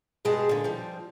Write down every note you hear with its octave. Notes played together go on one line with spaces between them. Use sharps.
G2 B2 G#3 G4 G#4 A5
A#2 D3
F3 G3